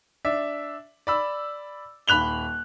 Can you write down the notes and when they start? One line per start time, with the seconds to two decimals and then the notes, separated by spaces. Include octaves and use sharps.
0.25 D4 E5
1.07 D5 B5 E6
2.08 D#1 B5 F#6 F7 G7